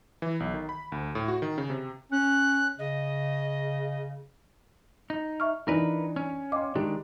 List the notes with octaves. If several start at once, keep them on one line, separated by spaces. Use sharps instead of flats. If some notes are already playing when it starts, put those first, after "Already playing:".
E3
B1
D#3
B5
D2
A2
F#4
D#3
C#3
C3
C#4 F#6
C#3 D#5
D#4
E5 C#6 F6
E3 D4 D#4 A#4 B4
C#4
D#5 F5 G5 C6 D6
D#3 G#3 D4 G4